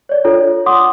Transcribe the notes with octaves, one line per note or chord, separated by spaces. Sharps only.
C#5 D5
D4 F4 A4 C#5
F#5 C6 D6 D#6